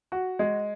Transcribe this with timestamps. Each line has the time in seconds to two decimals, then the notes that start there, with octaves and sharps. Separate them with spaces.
0.12 F#4
0.39 G#3